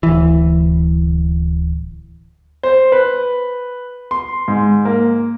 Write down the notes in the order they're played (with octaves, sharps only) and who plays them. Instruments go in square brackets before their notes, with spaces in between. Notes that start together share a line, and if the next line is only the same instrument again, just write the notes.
[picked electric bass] D1 E3
[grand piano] C5
B4
C6
G#2
A#3